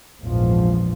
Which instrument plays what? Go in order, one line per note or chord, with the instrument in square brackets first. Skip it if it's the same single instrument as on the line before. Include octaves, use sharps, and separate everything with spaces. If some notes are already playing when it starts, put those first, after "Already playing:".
[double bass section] A#1 E2 G#2 F3